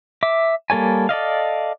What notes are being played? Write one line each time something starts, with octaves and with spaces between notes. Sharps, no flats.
E5 D6
G3 A#3 A4 C#5 G#5
A4 D5 D#5 F5